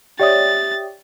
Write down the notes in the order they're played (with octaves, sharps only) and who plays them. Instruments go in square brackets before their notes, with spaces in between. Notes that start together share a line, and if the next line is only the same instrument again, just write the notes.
[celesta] G4 E5 D#6 [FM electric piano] C#5 D5 G5 [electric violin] A6